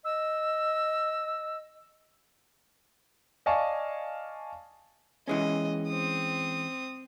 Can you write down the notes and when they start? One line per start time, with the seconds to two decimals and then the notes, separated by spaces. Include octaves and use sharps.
0.05 D#5 E6
3.46 D5 D#5 F5 G#5 A5 C#6
5.28 E3 G#3 C#4 D#5
5.88 C4 D#6